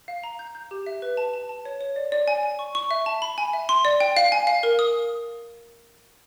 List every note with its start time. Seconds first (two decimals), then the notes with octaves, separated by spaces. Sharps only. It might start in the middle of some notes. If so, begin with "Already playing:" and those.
0.08 F5
0.24 A#5
0.39 G6
0.55 G6
0.71 G4
0.86 E5
1.02 B4
1.17 A5
1.33 A5
1.49 A5
1.65 C#5
1.81 C#5
1.96 D5
2.12 D5
2.28 G#5
2.43 G#5
2.59 C#6
2.75 C#6
2.91 E5
3.06 A5
3.22 B5
3.38 G#5
3.53 E5
3.69 C6
3.85 D5
4.00 G5
4.17 F5
4.32 G#5
4.47 F5
4.63 A#4
4.79 D#6